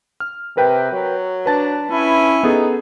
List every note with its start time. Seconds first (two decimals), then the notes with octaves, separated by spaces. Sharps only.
0.20 F6
0.57 C3 A#4 B4 G5
0.93 F#3
1.46 D4 B4 A5 A6
1.91 C#4 E4 G#5
2.43 B3 D#4 G#4 A4